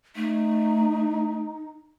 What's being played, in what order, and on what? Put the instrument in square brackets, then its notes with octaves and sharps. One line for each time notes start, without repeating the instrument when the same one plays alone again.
[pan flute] A3 [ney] D#4